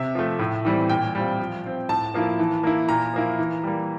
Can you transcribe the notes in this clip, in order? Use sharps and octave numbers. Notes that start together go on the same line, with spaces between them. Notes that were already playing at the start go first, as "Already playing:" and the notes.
Already playing: C3 E5
F3 A3
A2
E3 G3 C4
A#2 G5
G3 C4 F4
F3
C4 F4
A2 A5
F3 A#3 E4
E3
A#3 E4
A#2 A#5
F3 A#3 E4
E3
G3 A#3